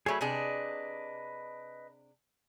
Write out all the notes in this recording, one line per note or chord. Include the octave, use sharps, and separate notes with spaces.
F#3 A3 G#4 C#5 B5
C3 D4 G#4 B4 D#5